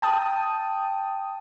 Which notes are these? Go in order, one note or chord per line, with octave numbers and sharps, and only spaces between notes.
G5 A5 D#6